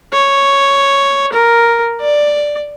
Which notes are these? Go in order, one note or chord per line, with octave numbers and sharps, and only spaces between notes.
C#5
A#4
D5